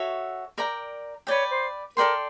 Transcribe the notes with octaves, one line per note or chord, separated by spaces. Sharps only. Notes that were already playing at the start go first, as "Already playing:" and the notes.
Already playing: F#4 A4 C#5 E5
A#4 D5 G5 A#5
B4 C#5 D5 G5
C5
A4 A#4 D5 G5 C6